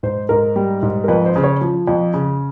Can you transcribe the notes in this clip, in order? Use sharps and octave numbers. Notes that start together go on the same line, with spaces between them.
G#2 C5
G#2 A#4
G3
G#2
A#4
F2 B4
C5
C#3
C#5
F3
F2
C#3